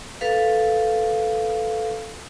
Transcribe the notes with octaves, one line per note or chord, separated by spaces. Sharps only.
A4 B4 F5